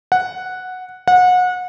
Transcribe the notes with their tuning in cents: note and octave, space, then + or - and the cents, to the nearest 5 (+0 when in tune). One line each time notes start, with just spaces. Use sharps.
F#5 -5
F#5 -30